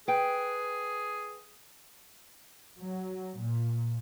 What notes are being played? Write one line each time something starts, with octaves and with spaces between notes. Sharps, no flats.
G#4 B4 G5
F#3
A#2